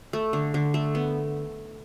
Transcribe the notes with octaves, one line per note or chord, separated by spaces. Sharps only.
A3
D3
D3
A3
B3